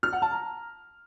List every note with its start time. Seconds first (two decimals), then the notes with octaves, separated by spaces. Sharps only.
0.03 F6
0.13 F#5
0.22 A5
0.32 A#5